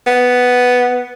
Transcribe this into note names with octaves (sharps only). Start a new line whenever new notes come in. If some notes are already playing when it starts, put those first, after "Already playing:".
B3